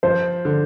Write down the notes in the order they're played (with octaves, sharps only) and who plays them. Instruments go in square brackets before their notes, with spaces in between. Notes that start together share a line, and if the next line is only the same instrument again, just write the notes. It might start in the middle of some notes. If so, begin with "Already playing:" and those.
[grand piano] F3 [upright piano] C5
[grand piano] D3